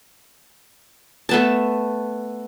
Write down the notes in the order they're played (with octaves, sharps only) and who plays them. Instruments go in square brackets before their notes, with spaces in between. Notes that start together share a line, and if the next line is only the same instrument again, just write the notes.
[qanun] A3 B3 A5